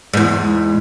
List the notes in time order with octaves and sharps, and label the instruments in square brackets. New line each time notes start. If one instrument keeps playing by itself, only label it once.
[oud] E2 G#2